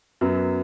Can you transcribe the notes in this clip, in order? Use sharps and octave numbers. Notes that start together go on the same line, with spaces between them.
F#2 F#3 B3